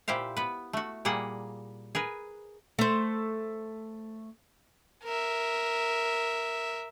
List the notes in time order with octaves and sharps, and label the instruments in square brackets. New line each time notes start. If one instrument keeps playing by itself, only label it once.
[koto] A#2 E4 G4 C5 F5
B3 B4
A3 F#4
A#2 G3 A#3 G#4 F#5
G#4 A#4 B4
[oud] A3 C5
[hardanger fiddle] A#4 E5